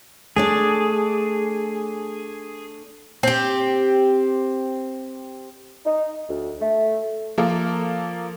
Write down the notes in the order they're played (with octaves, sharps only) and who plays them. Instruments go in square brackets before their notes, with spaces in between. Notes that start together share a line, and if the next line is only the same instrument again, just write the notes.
[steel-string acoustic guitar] A3 D4 D5 [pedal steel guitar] G#4
[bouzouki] C4 G4
[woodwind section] D#4
D2
A3
[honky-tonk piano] F3 A#3 A4